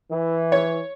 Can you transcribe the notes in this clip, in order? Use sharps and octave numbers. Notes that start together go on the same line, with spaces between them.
E3
C#5